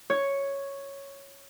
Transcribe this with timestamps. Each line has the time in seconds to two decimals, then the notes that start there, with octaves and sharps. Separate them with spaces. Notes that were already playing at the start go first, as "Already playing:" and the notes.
0.10 C#5